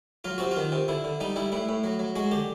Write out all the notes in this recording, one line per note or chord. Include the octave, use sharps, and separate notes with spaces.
F#3 F4
C3 F#4
F4
D#3
C3
D3 E4
D3
G3 D#4
G3 E4
A2 E4
A2
F#3
F#3
G#3 F#4
D3 G4